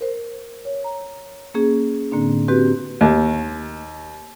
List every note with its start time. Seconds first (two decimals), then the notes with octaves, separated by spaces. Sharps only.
0.01 A#4 C5
0.65 C#5
0.84 A#5
1.54 A#3 C#4 G#4
2.12 A2 D3 A#3 C4 D4
2.48 C4 F#4 G4 B4
3.01 D#2